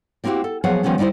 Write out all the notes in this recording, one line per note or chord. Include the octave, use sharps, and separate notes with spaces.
G3 A#3 C4 E4 F#4 G4
A4
F3 F#3 B3 G#4 F5 F#5
D#3 F3 G3 B3 C#4
D3 G3 D#4 E4 C5